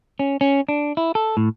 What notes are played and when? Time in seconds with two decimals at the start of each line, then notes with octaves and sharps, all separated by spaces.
0.19 C#4
0.41 C#4
0.69 D4
0.97 E4
1.15 A4
1.37 A2